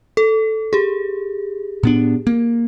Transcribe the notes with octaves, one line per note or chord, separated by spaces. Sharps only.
A4
G4 G#4
A2 B3 D4
A#3